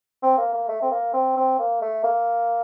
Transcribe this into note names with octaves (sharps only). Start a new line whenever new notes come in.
C4
A#3
A#3
A3
C4
A#3
C4
C4
A#3
A3
A#3